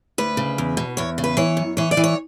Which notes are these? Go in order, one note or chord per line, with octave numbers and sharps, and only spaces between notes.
D2 B4
C#3
E2
B2
E2 C#5
C#3
B4
E3 C#5
F#2
E3 C#5
D5
E3
C#5